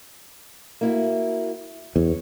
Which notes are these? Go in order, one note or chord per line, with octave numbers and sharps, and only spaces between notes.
A#3 E4 F#4
E2 C#5